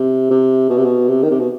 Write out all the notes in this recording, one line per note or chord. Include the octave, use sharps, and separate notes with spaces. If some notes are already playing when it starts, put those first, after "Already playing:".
Already playing: C3
C3
B2
C3
B2
C3
D#3
C3
B2